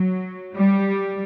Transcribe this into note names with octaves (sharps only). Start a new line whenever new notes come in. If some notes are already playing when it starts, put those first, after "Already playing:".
Already playing: F#3
G3